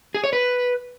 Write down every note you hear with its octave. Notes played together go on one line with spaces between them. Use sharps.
G#4
C#5
B4